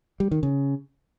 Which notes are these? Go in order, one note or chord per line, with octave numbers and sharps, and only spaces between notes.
G3
D#3
C#3